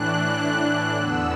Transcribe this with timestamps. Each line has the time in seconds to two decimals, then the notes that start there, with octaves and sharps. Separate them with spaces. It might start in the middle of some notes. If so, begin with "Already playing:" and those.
Already playing: A2 E3 D4 F#6
0.95 E2 D3 B3 E6